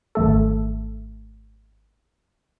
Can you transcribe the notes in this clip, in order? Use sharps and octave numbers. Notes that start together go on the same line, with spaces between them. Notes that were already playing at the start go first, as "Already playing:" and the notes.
G#1 A3 A4